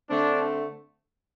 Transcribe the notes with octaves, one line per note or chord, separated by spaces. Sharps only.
D3 A3 C4 D4